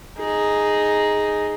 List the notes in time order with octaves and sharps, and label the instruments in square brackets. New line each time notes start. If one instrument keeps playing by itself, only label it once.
[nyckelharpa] D#4 G#4